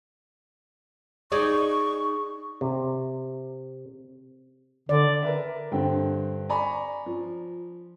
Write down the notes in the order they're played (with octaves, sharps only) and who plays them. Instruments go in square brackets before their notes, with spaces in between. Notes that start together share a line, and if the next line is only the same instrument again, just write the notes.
[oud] D#4 G#4 D5 [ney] C#6
[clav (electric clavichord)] C3
[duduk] D3 [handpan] D5
[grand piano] A#4 B4 E5
G2 D3 C4 G5
D5 G#5 A#5 B5 C#6
F3